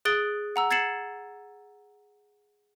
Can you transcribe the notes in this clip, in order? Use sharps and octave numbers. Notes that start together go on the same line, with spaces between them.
G#4 D#6 F#6 A6 D7 G7
F#5 A#5 E6
G#6 A6 C7 C#7 E7 F#7